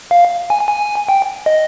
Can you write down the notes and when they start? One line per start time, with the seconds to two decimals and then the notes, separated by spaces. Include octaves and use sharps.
0.11 F5
0.50 G#5
0.68 G#5
1.09 G5
1.46 D#5